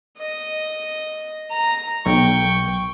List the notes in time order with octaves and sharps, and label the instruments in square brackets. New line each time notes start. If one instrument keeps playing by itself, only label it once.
[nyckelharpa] D#5
A#5
[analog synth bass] B1 [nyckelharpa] G5 C#6